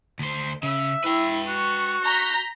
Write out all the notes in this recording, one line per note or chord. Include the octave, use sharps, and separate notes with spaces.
D2 C5
C#3 E5
E4 B4 G5
F#4 C#6
A#5 G6 B6